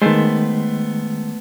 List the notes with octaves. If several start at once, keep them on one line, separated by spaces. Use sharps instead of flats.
D#3 G#3 A3 B3 C5